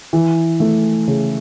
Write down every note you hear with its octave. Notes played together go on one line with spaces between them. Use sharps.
E3
A3
C#3